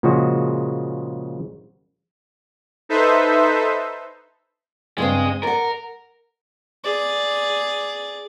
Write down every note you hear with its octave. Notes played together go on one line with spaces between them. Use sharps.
A#2 C#3 F3 G#3 F#4
D#4 A4 B4 C5 E5
G2 C#3 G#3 C4
A#4 D5 F#5
G#4 D5